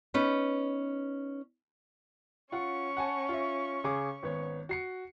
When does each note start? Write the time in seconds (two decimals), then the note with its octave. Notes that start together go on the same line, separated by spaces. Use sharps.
0.14 B3 C#4 D#4 B4
2.52 C#4 F4 F#5 C#6
2.97 F#5 G#5 A5
3.29 F4 E5
3.84 C#3 G#4 D6
4.23 G#1 B3 C#5
4.69 F#4 C7 C#7